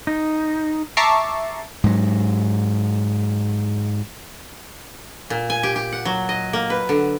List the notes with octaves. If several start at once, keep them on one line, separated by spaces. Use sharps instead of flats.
D#4
E5 A5 A#5 C#6 D6 C7
G#2 F#3
A#2
G#5
G4
G4
F#5
F#3
D#5
A#3
B4
D3